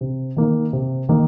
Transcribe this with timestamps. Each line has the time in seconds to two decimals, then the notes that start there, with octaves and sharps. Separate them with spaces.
0.01 C3
0.37 D#3 A#3 D#4
0.73 C3
1.09 D#3 A#3 D#4